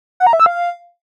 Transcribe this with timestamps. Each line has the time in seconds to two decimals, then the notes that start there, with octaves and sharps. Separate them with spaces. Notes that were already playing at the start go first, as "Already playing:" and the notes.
0.20 F#5
0.27 A#5
0.33 E5
0.40 E6
0.46 F5